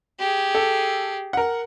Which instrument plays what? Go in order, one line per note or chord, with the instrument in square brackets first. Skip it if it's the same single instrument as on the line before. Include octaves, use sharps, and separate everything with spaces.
[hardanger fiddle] G4 G#4
[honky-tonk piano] A4
A#4 F#5